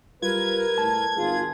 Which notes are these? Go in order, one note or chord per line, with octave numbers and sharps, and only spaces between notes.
G3 F4 A#4 B4 G#6
A2 A5
G#1 F4 G#4